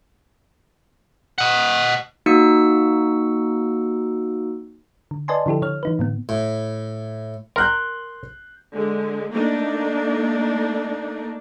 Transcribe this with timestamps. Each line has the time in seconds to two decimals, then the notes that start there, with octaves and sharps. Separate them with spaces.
1.38 D#5 F#5
2.26 A#3 D#4 F#4 E6 C#7
5.11 D3
5.28 B4 D5 D#5 G#5 A5 C6
5.46 D3 F3 E4 G4 A4
5.62 D3 C#5 F6
5.83 E3 D#4 B4
5.99 A2 D3 B3
6.29 A2
7.56 A#4 C6 F#6 G6
8.73 D3 G#3
9.32 A3 A#3 D4 D#4